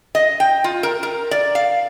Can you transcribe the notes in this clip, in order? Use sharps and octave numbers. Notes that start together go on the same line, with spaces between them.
D#5
G5
F4
A#4
A#4
D5
F5